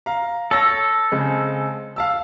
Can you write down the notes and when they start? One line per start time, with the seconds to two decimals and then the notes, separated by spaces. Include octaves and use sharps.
0.06 F5 A#5
0.51 A4 C#5 E6 A#6
1.11 C#3 G#3 C4
1.96 F5 A5 E6